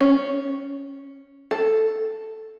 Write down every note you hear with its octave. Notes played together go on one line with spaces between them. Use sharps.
C#4
A4